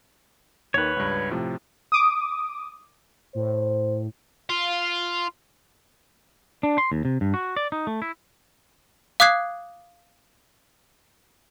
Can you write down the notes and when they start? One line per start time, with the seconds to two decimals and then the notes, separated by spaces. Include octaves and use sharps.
0.74 D#2 D#3 B4 C#5
0.96 C#2 G2
1.31 A2 C3 F3
1.92 D6 D#6
3.35 A2 C5
4.50 F4
6.63 D4
6.78 C6
6.92 D#2
7.05 C3
7.21 G2
7.34 F#4
7.56 D5
7.72 D#4
7.87 A3
8.02 E4
9.20 F5 D6 D#6 F#6 G#6 C7